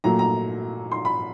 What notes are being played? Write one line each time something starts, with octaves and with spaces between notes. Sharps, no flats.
A#2 F#3 A3 A#5
A#5
C6
B5